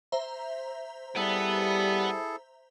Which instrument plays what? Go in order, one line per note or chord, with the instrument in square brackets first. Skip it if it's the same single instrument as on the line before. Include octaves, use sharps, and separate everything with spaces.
[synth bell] C5 E5 A#5
[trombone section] G3 [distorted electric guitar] B3 [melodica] E4 G#4 A4